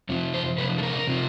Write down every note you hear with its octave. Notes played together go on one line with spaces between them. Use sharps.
F2 C3 F3
C5
F2 C3 F3 B4
A4
A#4
C3 F3